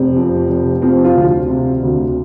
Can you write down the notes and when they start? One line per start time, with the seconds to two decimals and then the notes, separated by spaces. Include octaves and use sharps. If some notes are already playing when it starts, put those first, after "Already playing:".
Already playing: F1 C4
0.16 F2
0.50 F1
0.82 F3 C4
1.04 F4
1.16 D2
1.49 C3
1.83 D2